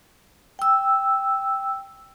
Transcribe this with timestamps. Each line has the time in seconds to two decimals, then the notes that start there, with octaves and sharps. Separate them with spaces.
0.59 G5 E6